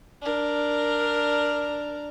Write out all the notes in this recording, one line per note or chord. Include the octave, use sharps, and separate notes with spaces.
D4 A#4